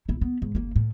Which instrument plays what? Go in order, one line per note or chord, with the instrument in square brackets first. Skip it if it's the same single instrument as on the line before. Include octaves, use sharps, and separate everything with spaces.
[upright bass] B1 E4
B3
G#2
F#1 A#3
A2